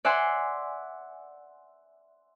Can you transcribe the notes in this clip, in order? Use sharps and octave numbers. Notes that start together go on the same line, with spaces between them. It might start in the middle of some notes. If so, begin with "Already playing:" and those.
D5 E5 F#5 G#5 C6